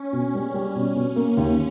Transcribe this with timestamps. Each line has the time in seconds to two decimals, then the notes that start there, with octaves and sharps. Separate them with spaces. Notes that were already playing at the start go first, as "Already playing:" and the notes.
Already playing: C#4
0.13 B2
0.35 G3
0.54 G3
0.75 B2 C#4
0.96 B2
1.16 A#3
1.37 D#2